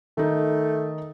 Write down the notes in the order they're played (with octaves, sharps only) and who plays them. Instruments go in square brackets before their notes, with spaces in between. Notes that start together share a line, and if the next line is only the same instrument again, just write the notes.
[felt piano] D#3 D#4 [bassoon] A3